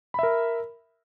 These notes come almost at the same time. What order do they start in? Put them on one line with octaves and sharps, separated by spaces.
B5 E5 A#4